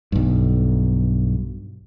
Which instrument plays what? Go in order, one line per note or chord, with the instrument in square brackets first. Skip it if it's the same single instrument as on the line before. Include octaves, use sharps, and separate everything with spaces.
[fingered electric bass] B1 G2